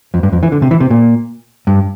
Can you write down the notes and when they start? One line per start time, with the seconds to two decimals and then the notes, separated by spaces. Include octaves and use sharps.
0.14 F2
0.23 G2
0.32 F2
0.43 E3
0.52 D3
0.62 C3
0.71 E3
0.80 C3
0.90 A#2
1.67 G2